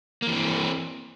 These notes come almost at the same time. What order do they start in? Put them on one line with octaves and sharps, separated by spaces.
A#3 E3 C4